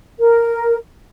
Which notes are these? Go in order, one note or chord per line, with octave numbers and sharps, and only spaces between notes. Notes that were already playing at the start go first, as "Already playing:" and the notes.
A#4